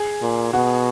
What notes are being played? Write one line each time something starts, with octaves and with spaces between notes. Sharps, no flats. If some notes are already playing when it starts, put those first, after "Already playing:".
Already playing: G#4
A#2
B2 F#4